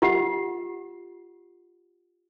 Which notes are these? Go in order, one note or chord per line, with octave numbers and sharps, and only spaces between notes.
F4 G4 F#5